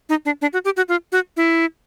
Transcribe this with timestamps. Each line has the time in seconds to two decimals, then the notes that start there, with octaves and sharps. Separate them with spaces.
0.09 D#4
0.25 D4
0.42 D4
0.53 F#4
0.65 G4
0.77 F#4
0.89 F4
1.12 F#4
1.37 E4